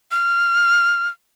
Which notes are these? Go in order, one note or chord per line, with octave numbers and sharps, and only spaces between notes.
F6